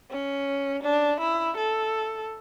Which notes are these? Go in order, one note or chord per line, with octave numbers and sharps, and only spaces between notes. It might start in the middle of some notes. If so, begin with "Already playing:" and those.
C#4
D4
E4
A4